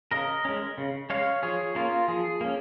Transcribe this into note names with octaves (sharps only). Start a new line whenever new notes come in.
C#3 A#4 D#5
G#3 C#4
C#3
G#3 C#4 C#5 F5
F3 G#4 C#5
A#3 C#4 F4 A#4
F3 G#4
A#3 C#4